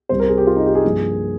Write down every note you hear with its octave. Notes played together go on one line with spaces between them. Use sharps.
C2 C3 G3 C5
A#4
G#4
G4
F4
D#4
G4
G#4
G2 F3 A#3